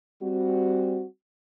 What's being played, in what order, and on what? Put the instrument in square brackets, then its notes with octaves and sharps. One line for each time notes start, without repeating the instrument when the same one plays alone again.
[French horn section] G3 C4 F#4